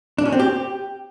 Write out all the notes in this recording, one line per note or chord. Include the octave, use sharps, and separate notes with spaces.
D4
C#4
C4
G4